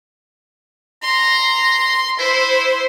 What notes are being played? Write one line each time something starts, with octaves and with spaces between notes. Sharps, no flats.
A#5 C6
E4 C5